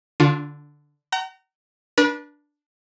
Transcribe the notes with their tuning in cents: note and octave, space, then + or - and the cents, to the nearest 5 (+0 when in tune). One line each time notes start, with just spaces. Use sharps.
D3 +0 D4 -25 F4 +20
F#5 +45 A#5 -20
D4 +0 B4 -35